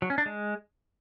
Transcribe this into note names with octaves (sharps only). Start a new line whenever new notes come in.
F#3
C#4
D4
G#3